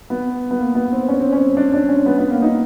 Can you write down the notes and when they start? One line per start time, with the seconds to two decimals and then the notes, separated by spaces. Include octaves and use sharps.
0.10 B3
0.51 B3
0.59 A#3
0.75 B3
0.92 C4
1.08 C#4
1.20 C4
1.32 C#4
1.57 D4
1.73 D4
1.89 C#4
2.06 B3
2.18 B3
2.30 A#3
2.42 D#4